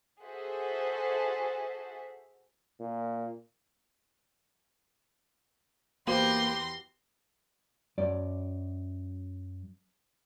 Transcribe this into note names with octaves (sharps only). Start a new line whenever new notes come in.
F#4 G#4 A4 C5 E5 F#5
A#2
E2 A#3 F#4 G4 B4 C5 C6 A#6
F#2 D5